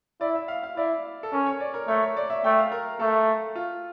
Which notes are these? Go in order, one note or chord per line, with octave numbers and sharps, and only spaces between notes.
E4 D5
E5
F5
F5
E4 D5
A4
C#4 A#4
C#5
D5
A#4
A3 C#5
C#5
D5
E5
A3 G5
F5
A#4
A3 A4
F4